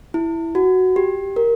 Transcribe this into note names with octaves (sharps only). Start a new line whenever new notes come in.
E4
F#4
G4
A#4